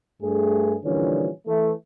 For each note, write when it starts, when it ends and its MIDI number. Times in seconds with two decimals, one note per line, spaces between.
0.22 0.75 43
0.22 0.75 57
0.22 0.75 68
0.84 1.29 46
0.84 1.29 50
0.84 1.29 52
0.84 1.29 53
0.84 1.29 55
0.84 1.29 61
1.47 1.72 52
1.47 1.72 57